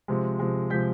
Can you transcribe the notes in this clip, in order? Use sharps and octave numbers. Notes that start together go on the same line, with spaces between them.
C3 F3 G#3
C3 F3 G#3
C3 F3 G#3 G6 B6